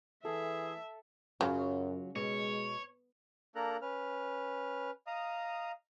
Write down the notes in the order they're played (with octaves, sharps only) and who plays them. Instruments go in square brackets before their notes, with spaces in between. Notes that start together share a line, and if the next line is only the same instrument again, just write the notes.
[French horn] E3 [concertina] G#4 [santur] A4 [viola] E5
[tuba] F#2 [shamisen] C#3 [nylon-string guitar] F#3 F4
[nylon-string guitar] B2 [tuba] G#3 [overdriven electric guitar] C#5
[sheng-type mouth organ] A#3 D4 A4 A#4 A#5 F#6
C#4 B4 F6
D#5 F5 A#5 D#6